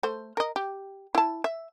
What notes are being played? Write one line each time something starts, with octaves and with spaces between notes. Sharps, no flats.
A3 C5
A#4 D#5
G4
E4 A5
E5